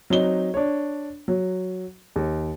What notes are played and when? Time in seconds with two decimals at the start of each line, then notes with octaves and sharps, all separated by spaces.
0.10 F#3 C4 D#4 G7
0.54 D4 C#5
1.28 F#3
2.16 D#2